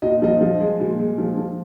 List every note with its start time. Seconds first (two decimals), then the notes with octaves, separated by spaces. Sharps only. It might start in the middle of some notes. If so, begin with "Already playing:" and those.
0.02 A#2 D#5
0.22 F3 D#5
0.41 F3
0.60 G#3
0.80 A#2
0.99 G#3
1.18 F3
1.37 F3